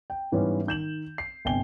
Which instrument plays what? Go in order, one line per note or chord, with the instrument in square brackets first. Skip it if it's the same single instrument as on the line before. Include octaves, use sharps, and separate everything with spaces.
[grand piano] G5
G#2 E3 G3 B3 C#4
D#3 G6 E7 F#7
C7
G1 C3 G5 G#5 G7